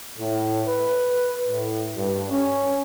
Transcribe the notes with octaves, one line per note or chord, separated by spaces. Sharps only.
A2
B4
A2
G2
C#4